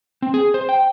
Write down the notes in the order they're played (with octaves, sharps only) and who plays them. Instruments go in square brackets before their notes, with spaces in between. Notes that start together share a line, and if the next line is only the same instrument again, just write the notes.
[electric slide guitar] C4
G#4
C5
G5